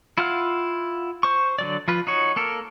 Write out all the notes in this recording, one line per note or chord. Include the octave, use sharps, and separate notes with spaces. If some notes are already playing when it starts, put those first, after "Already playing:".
E4 F4 F5 F#5 F6
C5 C#6
D3 F#3 D5
F3 F4 B4
D#4 F#4 C#5
A#3 A4 A#4